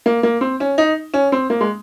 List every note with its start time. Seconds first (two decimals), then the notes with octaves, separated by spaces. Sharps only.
0.06 A#3
0.23 A#3
0.41 C4
0.60 C#4
0.78 D#4
1.14 C#4
1.32 C4
1.50 A#3
1.61 G#3